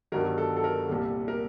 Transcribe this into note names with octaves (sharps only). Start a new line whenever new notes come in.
G1 G2 D#3 F#3 A#4
A4
A4
A#4
C2 A#2 G3 A4
A#4